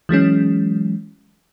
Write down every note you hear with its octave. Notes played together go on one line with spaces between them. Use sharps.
E3 F#3 G#3 C#4